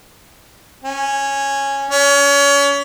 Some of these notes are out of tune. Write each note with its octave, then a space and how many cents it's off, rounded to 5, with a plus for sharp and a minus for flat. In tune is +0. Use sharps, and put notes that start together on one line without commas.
C#4 -10
C#4 +30